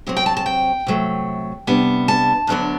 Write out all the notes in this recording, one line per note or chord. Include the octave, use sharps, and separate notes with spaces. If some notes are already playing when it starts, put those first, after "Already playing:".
C3 F#3 C4
G5
A5
A5
G5
C3 F#3 A3
C3 G3 B3 D4
A5
D2 D3 F#3 B3 D4